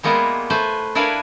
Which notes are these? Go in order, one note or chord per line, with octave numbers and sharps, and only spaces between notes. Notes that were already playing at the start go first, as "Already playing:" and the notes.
G3 G#3 A#3 B3 E4 F4
A3 B4 C5 G#5
D4 E4 A#4 B4 F5 G#5